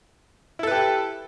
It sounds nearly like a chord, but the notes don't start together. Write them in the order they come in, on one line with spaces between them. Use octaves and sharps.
E4 A4 B4 G4